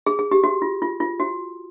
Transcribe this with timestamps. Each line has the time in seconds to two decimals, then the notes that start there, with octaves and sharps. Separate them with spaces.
0.06 G#4
0.19 G#4
0.31 G4
0.44 F#4
0.62 F4
0.82 F4
1.00 F4
1.20 F#4